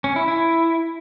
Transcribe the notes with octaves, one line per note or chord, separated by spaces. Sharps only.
C#4
E4
E4